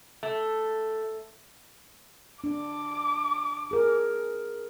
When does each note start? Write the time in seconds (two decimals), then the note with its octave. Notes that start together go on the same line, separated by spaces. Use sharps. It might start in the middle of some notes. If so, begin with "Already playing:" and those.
0.23 A3
2.44 D4 D6
3.71 G#4 A#4